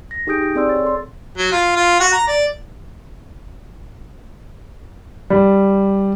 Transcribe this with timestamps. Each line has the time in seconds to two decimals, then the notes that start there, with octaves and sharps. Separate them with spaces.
0.11 A#6
0.27 D#4 G4 G#4 D#6 G6 D7
0.41 G4
0.55 C4 G#4 D5 C6 E6
0.69 C#5 A6
0.84 A4 C6
1.38 F#3
1.52 F4
1.76 F4
2.00 F#4
2.12 A#5
2.28 D5
5.30 G3